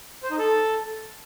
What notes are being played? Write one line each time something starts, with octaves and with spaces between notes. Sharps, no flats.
C5
D#4
A4